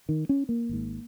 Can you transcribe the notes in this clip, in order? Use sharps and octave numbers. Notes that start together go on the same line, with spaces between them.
D#3
C#4
A#3
G#1 G#2